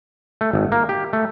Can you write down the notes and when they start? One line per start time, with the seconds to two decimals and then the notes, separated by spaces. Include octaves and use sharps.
0.41 A3
0.53 G#1
0.72 A#3
0.89 G4
1.13 A3